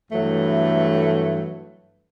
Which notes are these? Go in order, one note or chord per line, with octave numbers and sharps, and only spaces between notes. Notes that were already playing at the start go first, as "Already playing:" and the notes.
G2 E3 F#3 A3